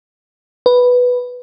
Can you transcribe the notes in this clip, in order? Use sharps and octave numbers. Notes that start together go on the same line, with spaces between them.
B4